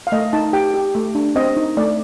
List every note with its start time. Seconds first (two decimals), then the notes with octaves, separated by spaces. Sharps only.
0.07 F5
0.12 A3 D#5
0.33 D#4 A5
0.53 G4 G5
0.74 G4
0.95 A3
1.15 D4
1.36 C4 D#5
1.57 D#4
1.77 A3 D5